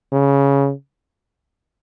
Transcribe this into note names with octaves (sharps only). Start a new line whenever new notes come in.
C#3